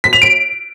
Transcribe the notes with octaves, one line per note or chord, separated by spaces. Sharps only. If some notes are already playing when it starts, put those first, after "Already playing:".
B6
F7
D7